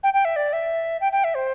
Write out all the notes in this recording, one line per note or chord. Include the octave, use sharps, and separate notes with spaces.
G5
G5
E5
D5
E5
G5
G5
E5
C5